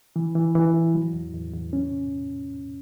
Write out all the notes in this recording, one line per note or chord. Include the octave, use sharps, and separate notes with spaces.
E3
E3
E3
E4
F#3
E2
E2
E2
C#4